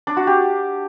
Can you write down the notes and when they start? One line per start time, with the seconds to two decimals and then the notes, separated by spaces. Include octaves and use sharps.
0.07 D4
0.17 F#4
0.27 G4